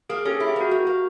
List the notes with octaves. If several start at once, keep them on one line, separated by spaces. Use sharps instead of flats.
A#3 G#4
C#4 G4 A4
E4 G#4
G4
A#3 F#4
A#3 F#4
A#3